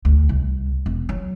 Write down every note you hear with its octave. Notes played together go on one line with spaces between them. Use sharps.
D2
C2
E1
F#3